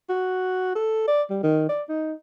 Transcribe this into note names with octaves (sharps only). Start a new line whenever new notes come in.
F#4
A4
D5
G3
D#3
D5
D#4